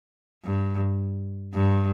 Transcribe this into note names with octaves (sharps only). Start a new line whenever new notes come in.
G2
G2